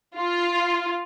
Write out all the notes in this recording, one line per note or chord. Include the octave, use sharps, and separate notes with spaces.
F4